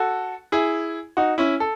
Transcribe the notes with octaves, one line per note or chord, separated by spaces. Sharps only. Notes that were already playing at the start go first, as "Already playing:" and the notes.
Already playing: F#4 A4
E4 G#4
D#4 F#4
C#4 E4
A4